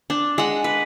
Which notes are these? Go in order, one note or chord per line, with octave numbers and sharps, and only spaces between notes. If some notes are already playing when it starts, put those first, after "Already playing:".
D4
G#3 F#5
B4